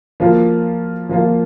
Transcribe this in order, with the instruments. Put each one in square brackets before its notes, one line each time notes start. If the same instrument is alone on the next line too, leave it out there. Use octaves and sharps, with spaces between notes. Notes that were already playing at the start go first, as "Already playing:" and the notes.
[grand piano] F3 A#3 F4
F3 A#3 F4